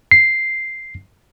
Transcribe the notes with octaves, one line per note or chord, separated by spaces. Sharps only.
C7